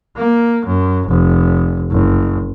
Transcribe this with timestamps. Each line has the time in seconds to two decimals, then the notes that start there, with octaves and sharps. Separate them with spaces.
0.16 A#3
0.66 F#2
1.08 F1
1.91 F#1